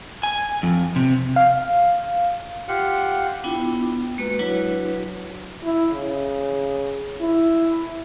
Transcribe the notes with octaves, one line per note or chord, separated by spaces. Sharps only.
G#5
F2
C3
F5
F4 G4 F#5
B3 D4 E4 F4 G5 D6
G#3 A#3 F#4 B4
F#3 D4 E4 F#4 B4 C#5
E4
C#3
E4